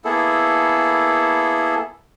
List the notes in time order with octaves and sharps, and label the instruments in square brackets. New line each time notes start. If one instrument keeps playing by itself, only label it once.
[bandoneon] A#3 B3 E4 G#4 A4